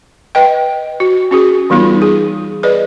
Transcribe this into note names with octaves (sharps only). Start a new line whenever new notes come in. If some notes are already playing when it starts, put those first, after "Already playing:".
B4 D#5 G5
F#4
C#4 F#4 G#4
E3 G3 B3 D#4 F4
G#4
G#4 B4 D5 D#5